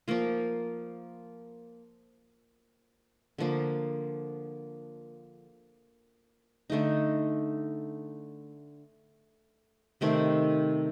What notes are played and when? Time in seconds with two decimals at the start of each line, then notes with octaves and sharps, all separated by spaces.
0.08 F3 A#3 F4
3.38 D3 F3 A#3
6.70 D3 A3 D#4
10.01 C3 D#3 A3 C4